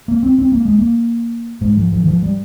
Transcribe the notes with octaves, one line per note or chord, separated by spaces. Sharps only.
A#3
C4
C4
A#3
G#3
A#3
G#2 G#3
F3
F3
D#3
F3
G3